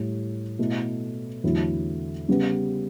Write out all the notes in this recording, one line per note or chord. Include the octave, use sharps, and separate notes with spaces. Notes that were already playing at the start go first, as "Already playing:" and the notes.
Already playing: A2 G3
B2 A3 E4
E2 D3 F#3 A3 E4
C#3 G3 B3